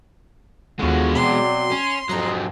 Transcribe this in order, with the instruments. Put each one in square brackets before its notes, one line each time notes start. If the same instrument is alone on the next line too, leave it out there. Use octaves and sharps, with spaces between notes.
[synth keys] D#2 D3 [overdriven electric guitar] G#3 B3 [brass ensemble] F4 F#4
[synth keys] B2 [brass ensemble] F#3 C4 D5 [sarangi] C6
[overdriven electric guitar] C#4
[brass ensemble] F2 [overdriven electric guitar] G#2 F#3 [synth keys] D#5 A#5